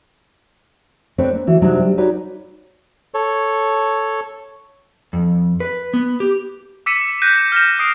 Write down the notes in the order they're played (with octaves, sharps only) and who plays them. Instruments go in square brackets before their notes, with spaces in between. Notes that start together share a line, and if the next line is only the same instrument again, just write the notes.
[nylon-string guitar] C4 D4 A4 B4 C#5
A#3
D3 E3 F#4
C3 F#3 G3 D4 D#4
G3
D#4 F#4 G#4 B4 C#5 D5
[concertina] A4 C#5
[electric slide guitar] F2
B4
B3
G4
[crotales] D6 E6 B6 C#7 D#7 E7
F#6 G6 A#6 B6 D#7
F6 G6 A#6 E7
D#6 C7 D7